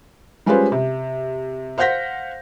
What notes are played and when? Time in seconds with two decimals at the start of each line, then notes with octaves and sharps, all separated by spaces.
0.46 G3 G#3 C#4 F4 B4 C5
0.72 C3
1.78 C5 F5 F#5 G6 A#6 B6